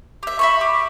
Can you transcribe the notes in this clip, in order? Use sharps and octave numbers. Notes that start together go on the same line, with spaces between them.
G4 E5
E5 B5 C#6
G4